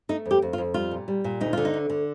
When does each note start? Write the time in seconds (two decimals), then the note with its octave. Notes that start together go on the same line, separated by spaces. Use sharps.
0.09 A3 D#4
0.25 F2
0.31 G4
0.42 F2
0.53 F4
0.58 F2
0.74 G3 F4
0.91 A#2
1.08 G3
1.24 A#2
1.41 D2 D#4
1.53 D3 F4
1.65 D#4
1.74 D2
1.90 D3